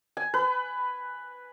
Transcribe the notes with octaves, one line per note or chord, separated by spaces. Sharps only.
G#5
B4